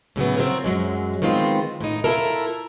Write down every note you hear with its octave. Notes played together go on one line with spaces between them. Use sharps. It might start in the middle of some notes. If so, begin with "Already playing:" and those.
A2 C#3 F#3 B3
C4 D#4 F4 F#4 A#4 C#5
F#2 F#3 G#3
D#3 G#3 B3 C4 F4
A2 D#4
E4 F4 A4 A#4